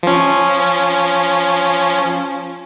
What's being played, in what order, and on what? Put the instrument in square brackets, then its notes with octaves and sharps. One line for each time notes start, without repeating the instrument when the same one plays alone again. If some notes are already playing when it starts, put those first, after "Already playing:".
[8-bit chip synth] F3 C#4